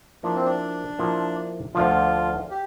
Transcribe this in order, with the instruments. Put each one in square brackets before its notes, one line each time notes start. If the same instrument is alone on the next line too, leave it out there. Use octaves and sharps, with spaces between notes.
[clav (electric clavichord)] F3 A#3 E4 [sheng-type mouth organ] D4
[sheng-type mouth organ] C4
D4
[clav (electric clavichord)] F3 A#3 E4
[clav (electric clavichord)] D2 D3 F3 [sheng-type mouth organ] F4
[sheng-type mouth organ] G4